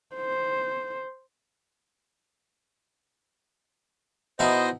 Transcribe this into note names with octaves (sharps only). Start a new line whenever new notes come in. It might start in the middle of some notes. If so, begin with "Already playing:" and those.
C5
B2 D#4 E4 C5 D#5